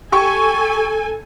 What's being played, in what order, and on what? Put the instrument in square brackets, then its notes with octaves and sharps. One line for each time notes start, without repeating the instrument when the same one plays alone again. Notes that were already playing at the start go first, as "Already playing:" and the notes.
[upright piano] G4 C#6 [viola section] A4 G#5